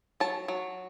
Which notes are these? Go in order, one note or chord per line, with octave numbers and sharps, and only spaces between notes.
F#3 A5
F#3